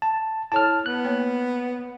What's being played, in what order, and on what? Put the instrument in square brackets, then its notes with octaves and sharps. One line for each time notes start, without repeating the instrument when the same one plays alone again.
[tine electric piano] A5
[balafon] E4 A4 C#5 [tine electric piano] A5 F6
[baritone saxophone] B3 [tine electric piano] F#6
[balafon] A#3 C#5 G5